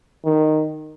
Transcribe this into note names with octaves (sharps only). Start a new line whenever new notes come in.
D#3